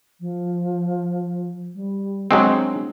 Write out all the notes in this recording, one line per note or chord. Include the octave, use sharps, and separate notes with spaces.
F3
G3
F#3 G#3 C4 D4